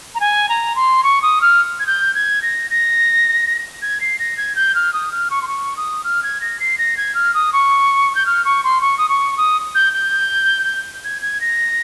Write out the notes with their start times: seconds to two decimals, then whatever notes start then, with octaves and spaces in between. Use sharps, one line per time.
0.15 A#5
0.20 G#5
0.49 A#5
0.75 C6
1.03 C#6
1.22 D#6
1.41 F6
1.79 G#6
1.87 G6
2.15 G#6
2.42 A#6
2.70 A#6
3.82 G#6
4.01 C7
4.19 A#6
4.37 G#6
4.55 G6
4.75 F6
4.93 D#6
5.12 F6
5.30 C#6
5.42 C6
5.48 C#6
5.76 D#6
6.04 F6
6.23 G#6
6.41 A#6
6.60 C7
6.78 A#6
6.97 G#6
7.14 F6
7.34 D#6
7.53 C#6
8.15 G6
8.26 F6
8.45 C#6
8.64 C6
8.81 C#6
8.98 D#6
9.09 C#6
9.37 D#6
9.75 G6
9.93 G6
11.04 G#6
11.22 G#6
11.41 A#6